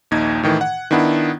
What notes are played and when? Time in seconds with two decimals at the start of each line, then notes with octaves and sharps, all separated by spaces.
0.11 A#1 D#2 D#4 G#6
0.43 A2 D#3 E3
0.61 F#5
0.91 D#3 B3 D4 E4 F#5